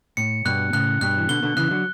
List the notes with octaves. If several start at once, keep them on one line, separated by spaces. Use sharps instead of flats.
A2 C#7
G2 B2 F#6
A2 C#3 F#6
G2 B2 F#6
E3
B2 D3 G7
B2 D3
C#3 E3 F#6
D3 F#3